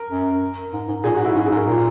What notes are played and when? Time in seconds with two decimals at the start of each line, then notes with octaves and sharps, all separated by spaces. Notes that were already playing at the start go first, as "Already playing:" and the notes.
Already playing: A#4
0.10 F#2
0.73 G#2
0.88 G#2
1.04 A#2 G#4
1.15 F#4
1.20 G#2
1.25 E4
1.35 G#2 F#4
1.46 G#4
1.51 G#2
1.56 A#4
1.67 A#2 A#4